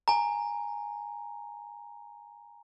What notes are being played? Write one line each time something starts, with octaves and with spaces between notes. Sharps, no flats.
G#5 A#5